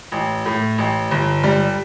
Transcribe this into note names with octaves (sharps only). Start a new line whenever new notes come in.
A1
A2
A1
G1
G3